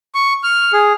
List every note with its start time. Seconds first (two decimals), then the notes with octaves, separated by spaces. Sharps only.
0.15 C#6
0.43 F6
0.73 G#4